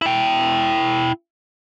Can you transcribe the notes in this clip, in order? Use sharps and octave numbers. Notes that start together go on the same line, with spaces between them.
E4 G5